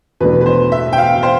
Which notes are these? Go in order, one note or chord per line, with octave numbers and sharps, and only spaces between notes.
E2 B2 A3 D4 B4
B4
C5
E5
G5
F5
C5